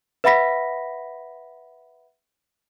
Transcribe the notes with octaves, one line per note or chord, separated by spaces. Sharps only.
B4 E5 F#5 B5 A#6 B6